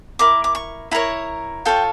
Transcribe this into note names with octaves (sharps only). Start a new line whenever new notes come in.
E4 A#4 D6
D6
C#6
E4 A#4 C#5 A#5
F4 A4 C#5 G5